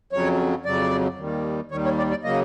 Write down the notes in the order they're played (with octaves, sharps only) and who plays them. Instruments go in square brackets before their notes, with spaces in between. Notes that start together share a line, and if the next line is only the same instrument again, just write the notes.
[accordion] F2 C#3 F#3 C#5
F2 C#3 F#3 D5
D#2 D#3 G3
D#2 D#3 G3 C#5
C#5
D5
D5
C#3 F#3 A#3 D#5